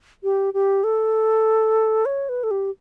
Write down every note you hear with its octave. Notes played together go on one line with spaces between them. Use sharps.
G4
G4
A4
C#5
B4
A4
G4